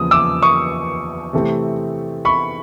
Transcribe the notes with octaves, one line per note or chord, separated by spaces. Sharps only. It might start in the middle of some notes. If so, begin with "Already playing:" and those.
Already playing: E2 C#3 F3 A#3 D#6
D6 E6
C#6 D#6
C3 E3 A3 C4
B5 C#6